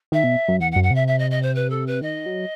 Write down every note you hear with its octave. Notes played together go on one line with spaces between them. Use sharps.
D#3 E5
B2
F#2
E2 F#5
F#5
F#2
F#5
C3 E5
E5
D#5
D#5
C5
B4
A4
B4
D#3 D#5
F#3